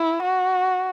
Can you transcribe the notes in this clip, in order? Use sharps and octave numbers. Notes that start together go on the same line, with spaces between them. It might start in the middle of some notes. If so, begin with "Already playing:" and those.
Already playing: E4
F#4